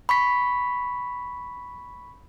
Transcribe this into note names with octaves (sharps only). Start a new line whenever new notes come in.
B5 C#6 B6